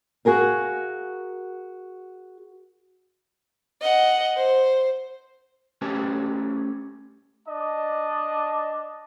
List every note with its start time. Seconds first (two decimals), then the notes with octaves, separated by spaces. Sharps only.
0.25 F#4 G#4 A#4 F5
3.82 D#5 F#5
4.37 C5
5.82 A3 C#4 G4 B4 C5 A5
7.48 D4 D5 D#5 A5